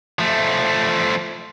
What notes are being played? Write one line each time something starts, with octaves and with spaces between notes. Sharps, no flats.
F3 A3